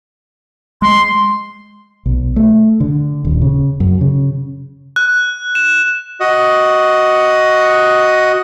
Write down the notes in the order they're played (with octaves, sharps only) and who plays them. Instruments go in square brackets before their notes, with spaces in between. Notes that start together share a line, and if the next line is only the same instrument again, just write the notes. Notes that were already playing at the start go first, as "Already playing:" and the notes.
[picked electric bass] G#3 [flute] C6
[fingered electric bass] B1
A3
D3
D#1
C#3
F#2
C#3
[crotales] F#6
E7
[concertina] F#4 D#5